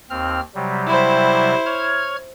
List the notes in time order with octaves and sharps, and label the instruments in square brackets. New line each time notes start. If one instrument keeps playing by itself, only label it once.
[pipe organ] D#2 C4 F6
C3 F#3 G3
[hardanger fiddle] E4 C5
[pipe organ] C#5 F6 G#6